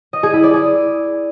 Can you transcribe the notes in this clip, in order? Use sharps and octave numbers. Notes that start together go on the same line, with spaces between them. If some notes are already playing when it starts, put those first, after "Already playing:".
D#5
G#4
E4
D5
G#4